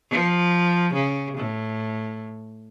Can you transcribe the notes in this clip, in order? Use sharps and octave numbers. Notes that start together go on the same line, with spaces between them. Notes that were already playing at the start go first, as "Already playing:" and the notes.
F3
C#3
A2